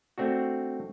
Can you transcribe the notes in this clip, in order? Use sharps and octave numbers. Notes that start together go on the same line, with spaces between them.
A3 C4 D4 F#4